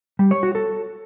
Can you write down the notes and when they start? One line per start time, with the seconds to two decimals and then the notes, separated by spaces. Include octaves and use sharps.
0.19 G3
0.31 C#5
0.43 F#4
0.55 A4